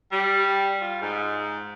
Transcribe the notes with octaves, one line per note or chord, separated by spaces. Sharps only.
G3
F4
G#2